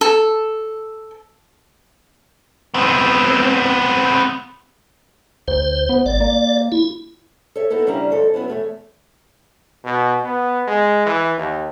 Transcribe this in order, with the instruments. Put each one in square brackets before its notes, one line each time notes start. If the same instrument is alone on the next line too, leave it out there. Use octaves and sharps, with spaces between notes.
[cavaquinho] A4
[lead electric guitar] B3 C4
[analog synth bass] D2 [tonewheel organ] C5
[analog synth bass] B3
[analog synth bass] G#1 [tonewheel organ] D5
[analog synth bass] A#3
[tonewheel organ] E4
[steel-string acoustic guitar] A4 C#5 E5
B3 D#4 E4 A4 A#4
C#3 G3 C#4 D4 E4 A#5
F2 C4 A4 C#5
F#3 B3 C#4 E4
E2 A3 C#5
[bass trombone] B2
B3
G#3
E3
D#2